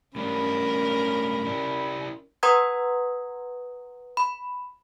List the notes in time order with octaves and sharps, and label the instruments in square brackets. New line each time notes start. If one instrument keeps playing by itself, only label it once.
[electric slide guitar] A2 G3 D4 [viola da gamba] C#4 A#4 [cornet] B5
[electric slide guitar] E4 G4 D5
[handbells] B4 F#5 A#5 C6 D#6 G#6
B5